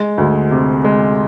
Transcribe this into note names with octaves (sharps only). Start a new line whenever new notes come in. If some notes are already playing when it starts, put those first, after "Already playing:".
Already playing: G#3
D2
C3
G#3